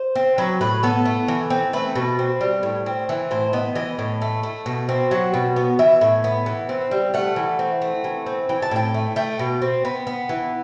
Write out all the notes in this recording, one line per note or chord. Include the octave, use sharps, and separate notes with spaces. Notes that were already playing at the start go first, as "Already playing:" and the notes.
Already playing: C5
C4
F#3 B4
A2 B4
B3 A4
A3
E3
C4
A3 B4
B2
C4
G3
A2
C4
E3
A2 C5
B3 D#5
E3 D#5
A2
A3
A3
B2
C4
F#3 F#5
B2
B3
E3 E5
A2
B3
E3
C4
G3
A3 F#5
E3
C4
A3
E3
C4
E3 G5
A5
A2 G5
A3
A3 G5
B2
C4
B3
B3
E3